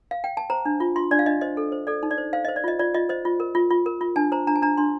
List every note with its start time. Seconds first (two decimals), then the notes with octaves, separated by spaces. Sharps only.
0.11 F5
0.24 G5
0.37 A5
0.50 C5 A#5
0.65 D4
0.80 F4
0.96 F4 C6
1.11 D4 D5
1.19 F5
1.26 D4 D#5
1.41 C5 D#5
1.57 A4
1.72 C5
1.87 A4 D5
2.03 D#4
2.11 D5
2.18 C5
2.33 C5 F5
2.45 C5 D#5
2.56 D5
2.64 F4 D#5
2.79 F4 D5
2.94 F4 D#5
3.09 C5 D#5
3.25 F4
3.40 A#4
3.55 F4
3.70 F4
3.86 A#4
4.01 F4
4.16 D4 A5
4.32 C5 A#5
4.47 D4 A#5
4.56 A5
4.62 D4 A#5
4.77 D4 C6